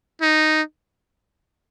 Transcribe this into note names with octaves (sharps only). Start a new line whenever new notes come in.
D#4